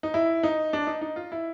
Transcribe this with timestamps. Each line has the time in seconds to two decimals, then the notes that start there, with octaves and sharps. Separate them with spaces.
0.03 D#4
0.14 E4
0.43 D#4
0.73 D4
0.87 D#4
1.01 D#4
1.16 F4
1.32 E4